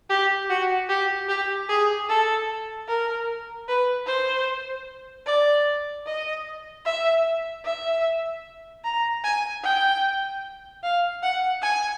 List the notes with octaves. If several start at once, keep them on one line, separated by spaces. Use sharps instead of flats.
G4
F#4
G4
G4
G#4
A4
A#4
B4
C5
D5
D#5
E5
E5
A#5
G#5
G5
F5
F#5
G#5